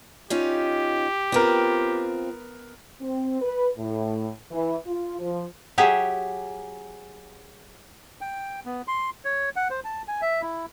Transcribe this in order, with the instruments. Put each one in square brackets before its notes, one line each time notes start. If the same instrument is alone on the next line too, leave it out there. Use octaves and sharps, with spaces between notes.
[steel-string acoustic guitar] C#4 D#4 F4 [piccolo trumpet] G4
[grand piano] B3 A#4 [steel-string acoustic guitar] C4 F4
[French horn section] C4
B4
A2
E3
F4
F3
[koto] F#3 G4 G#4 E5
[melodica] G5
B3
C6
C#5
F#5
C5
A5
G#5
E5
E4